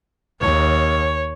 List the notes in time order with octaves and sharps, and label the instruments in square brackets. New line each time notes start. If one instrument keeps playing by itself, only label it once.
[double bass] D#2 [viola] C#5